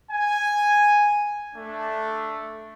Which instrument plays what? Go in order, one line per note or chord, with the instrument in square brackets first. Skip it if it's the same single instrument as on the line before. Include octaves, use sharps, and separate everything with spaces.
[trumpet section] G#5
A3 D4